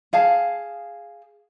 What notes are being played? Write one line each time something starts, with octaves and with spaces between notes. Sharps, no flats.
G#4 F5 A5